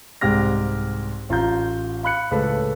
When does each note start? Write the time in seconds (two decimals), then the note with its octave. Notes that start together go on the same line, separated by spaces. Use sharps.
0.21 C2 G#2 G4 F6 A#6
1.29 A1 F4 A#5 G6
2.03 F5 B5 F#6 C#7
2.31 C#2 A2 A4 B4